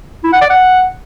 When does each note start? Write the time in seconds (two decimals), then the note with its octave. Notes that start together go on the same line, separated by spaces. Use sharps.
0.24 E4
0.33 F#5
0.41 D5
0.50 F#5